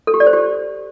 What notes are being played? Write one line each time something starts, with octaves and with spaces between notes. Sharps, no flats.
A4
G4
D5
C5
G4